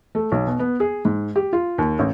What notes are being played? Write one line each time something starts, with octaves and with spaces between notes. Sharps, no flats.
A3
B1
B2
B3
G#4
G#2
G4
F4
D#2
A1